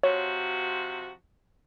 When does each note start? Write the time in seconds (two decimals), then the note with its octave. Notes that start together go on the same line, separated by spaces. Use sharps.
0.03 C3 F3 F#4 C#5